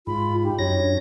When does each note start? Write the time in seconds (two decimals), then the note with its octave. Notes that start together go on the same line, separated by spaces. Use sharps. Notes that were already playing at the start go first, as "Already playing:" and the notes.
0.07 G#2 F4 B5
0.43 D#4 G4
0.59 F#2 C#5 A#6
0.81 D4